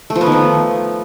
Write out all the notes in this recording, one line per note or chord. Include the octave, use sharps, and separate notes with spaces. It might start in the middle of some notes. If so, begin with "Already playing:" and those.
A3
F3
B3
D#3
F3